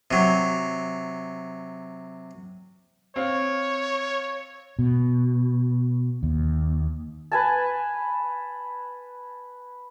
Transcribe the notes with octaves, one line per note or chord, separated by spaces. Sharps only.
C3 F#3
C4 C#5 F5
B2
D#2
B4 G#5 A5